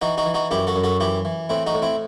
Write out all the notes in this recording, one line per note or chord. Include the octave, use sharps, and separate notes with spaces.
E3 D#4 F#4
D#4 F#4
E3
D#4 F#4
F#2 E4 G4
F#4 A4
F#2
F#4 A4
E3 E4 G4
E3
A2 C4 E4
D#4 F#4
A2
C4 E4